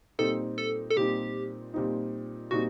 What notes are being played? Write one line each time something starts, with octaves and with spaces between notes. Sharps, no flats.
A#2 G3 C4 D#4 A4
A4
A4
A#2 G3 C4 D#4 G4
A#2 G3 C4 D#4
A#2 G3 C4 D#4 F#4